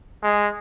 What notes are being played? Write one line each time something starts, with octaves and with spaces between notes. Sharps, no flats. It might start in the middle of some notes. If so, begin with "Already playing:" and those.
G#3